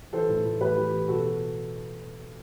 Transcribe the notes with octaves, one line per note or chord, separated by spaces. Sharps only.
E3 A4 C5
A2
A2
E3 G4 B4
E3
E3
B2 F#4 A4